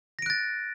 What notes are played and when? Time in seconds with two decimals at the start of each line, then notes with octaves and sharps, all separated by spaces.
0.19 A#6
0.22 D7
0.26 F#6
0.30 A6